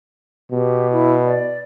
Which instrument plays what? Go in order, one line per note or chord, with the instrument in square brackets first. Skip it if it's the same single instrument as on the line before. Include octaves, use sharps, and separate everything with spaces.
[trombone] B2 [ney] G4
[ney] E4
D5